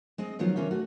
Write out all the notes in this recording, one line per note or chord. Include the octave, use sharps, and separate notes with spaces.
G#3 C4 D#5
D#3 F3 F#3 B3 C#4 F4
C3 D#3 E3 C#4 F4
A3 F#4